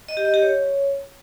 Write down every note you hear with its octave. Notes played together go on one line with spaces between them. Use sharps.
D#5
G4
D#5
G4
C#5